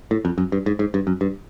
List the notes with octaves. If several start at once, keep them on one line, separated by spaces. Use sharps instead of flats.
A2
F2
F#2
G2
G#2
G#2
G2
F#2
G2